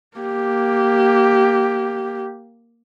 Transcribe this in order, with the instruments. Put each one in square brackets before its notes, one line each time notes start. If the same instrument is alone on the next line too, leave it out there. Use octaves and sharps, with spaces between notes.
[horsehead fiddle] A#3 G4